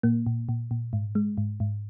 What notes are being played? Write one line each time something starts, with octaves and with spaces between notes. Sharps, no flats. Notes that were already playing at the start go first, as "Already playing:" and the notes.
A#2 A#3
A#2
A#2
A#2
G#2
G#3
G#2
G#2